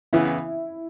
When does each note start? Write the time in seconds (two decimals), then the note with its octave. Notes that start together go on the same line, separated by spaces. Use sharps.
0.13 C#3 E3 B3 E4